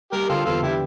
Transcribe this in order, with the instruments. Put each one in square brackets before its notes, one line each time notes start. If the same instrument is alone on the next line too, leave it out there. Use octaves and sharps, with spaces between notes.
[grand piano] G3 [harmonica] G4 A#4
[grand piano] D3 [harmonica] F4 A4
[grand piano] E2 [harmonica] F4 A4
[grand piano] D3 [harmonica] E4 G4